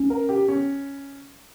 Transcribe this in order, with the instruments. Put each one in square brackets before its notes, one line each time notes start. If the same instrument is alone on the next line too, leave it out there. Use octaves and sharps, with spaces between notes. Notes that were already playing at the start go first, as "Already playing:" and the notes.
Already playing: [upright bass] C#4
[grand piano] A#4
G4
C#4